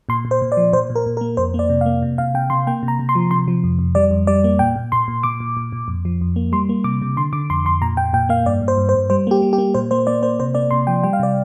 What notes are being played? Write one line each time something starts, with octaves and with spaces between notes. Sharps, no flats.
A#2 C6
A#2
C5
A#2
D5
F3
A#2 C5
A#2
A#4
A#2
A#4
A#3
F2 C5
A#3 D5
C3
F5
A#3
C3
C3 F5
C3 G5
C3 C6
A#3 G5
C3
A#5
C3
C6
F3
C3 C6
F3
F2
F2
G3 D5
F2
G3 D5
A#3
A#2 G5
A#2
A#2 C6
A#2
A#2 D6
A#2
A#2
A#2
F2
F3
F2
A#3
G3 C6
A#3
C3 D6
C3
D3 C6
D3 D6
F2 C6
F2 C6
A#2 A#5
A#2 G5
A#2 G5
A#3 F5
G2 D5
G2
C5
G2
C5
G2
G3 C5
A#3 G4
G3
G4
A#3
A#2 C5
A#3 C5
A#3 D5
A#3 C5
C3 C5
A#3 D5
C3 C6
F3 G5
G3 G5
F5
C3 D5